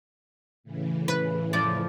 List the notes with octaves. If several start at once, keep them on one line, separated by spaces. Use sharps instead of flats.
A2 C#3 E3
B4
F2 F3 D5